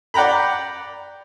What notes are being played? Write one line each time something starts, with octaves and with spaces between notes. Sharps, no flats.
D5 F#5 G5 A#5 B5